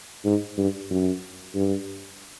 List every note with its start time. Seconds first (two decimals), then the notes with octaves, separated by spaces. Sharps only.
0.25 G#2
0.58 G2
0.90 F#2
1.55 G2